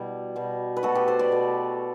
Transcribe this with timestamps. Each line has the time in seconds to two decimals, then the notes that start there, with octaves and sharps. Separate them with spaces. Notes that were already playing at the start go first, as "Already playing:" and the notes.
Already playing: B2 G3 E4
0.36 B2 G3
0.77 B4
0.83 B2 A3 F#4 A4
0.95 G4 B4
1.08 A4 C5
1.19 B4 D5
1.31 B2 A3